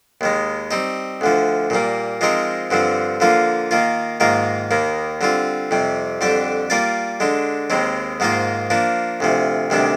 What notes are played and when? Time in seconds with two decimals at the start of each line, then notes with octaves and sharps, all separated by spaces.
0.21 D#2 D#3 G#3
0.71 G3 C4 D#4
1.21 D2 D3 F3
1.70 A#2 G3 A#3
2.21 F3 G#3 C4 D#4 A#4
2.71 G2 D3 F3 C4
3.20 D3 F3 A#3 F4
3.71 D#3 A#3 F4
4.20 G#2 D#3 A#3 F4 A#4
4.71 D#2 D#3 A#3
5.21 D3 G3 C4 F4
5.71 F2 C3 G3
6.21 F2 D3 G3 D4 G4
6.70 G3 A#3 F4 A#4 D5
7.20 D3 G#3 D4
7.70 D#2 D#3 G#3 C4
8.20 G#2 D#3 A#3 F4 C5
8.70 F3 A#3 D4
9.20 D2 C3 F3
9.70 D2 C3 D#3 G3 D4